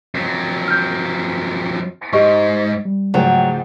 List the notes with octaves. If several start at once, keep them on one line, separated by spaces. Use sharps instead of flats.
F2 F#3
F6 G6
G#2 G4 D#5 C#6
G3
G#2 C#3 F3 F#3 A3 G5